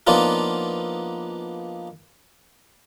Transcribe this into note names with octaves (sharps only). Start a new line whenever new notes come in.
F3 A#3 B3 D4 D#4 F4